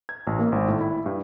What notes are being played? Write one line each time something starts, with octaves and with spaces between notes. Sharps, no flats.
G#6
A1
A#3
G#1
A2
E4
G2